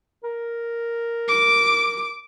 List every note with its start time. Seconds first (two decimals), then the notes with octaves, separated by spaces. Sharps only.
0.24 A#4
1.28 D6